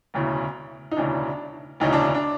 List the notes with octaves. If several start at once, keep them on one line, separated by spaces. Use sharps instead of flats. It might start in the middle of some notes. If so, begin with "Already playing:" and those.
E1 D2 C#3 E3
D#4
E1 D2 C#3 E3 D4
E1 D2 C#3 E3 D#4
D4
D4